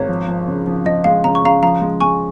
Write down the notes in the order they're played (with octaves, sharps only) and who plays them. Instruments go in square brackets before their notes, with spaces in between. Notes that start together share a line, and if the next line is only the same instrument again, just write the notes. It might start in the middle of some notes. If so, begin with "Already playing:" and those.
Already playing: [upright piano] G#1 [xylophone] C#5
[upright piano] F3
F3
C#3
F3
[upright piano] F3 [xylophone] D#5
[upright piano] G#3 [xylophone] F5
[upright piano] C#3 [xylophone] A#5
[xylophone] C#6
[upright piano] C#3 [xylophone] F5 A#5
[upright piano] F3 [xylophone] F5 A#5
[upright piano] G#3
[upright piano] G#3 [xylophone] G#5 C#6